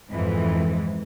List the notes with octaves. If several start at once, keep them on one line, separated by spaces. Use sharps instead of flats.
F2 G#2 E3